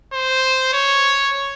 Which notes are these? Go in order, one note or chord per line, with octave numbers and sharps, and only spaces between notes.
C5
C#5